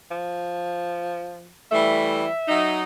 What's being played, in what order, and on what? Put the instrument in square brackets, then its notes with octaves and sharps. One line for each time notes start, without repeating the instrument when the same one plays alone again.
[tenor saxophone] F3
[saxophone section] E3 G3 A3 [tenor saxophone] E5
[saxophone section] F#3 D#4